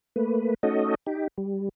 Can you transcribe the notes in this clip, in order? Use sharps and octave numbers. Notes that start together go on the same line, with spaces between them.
A3 A#3 B4
A3 C#4 D#4 F#4 A4 D#5
D#4 G4
G3